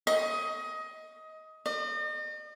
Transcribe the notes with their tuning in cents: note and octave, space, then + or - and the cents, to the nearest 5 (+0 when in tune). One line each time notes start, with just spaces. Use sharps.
D#5 +20
D#5 -45